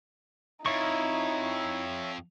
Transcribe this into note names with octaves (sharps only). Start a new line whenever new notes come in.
F2 D#4 E4 C#5 E5 C#6